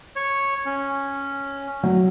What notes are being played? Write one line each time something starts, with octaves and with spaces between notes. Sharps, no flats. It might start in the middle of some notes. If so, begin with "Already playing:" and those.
C#5
C#4
F#3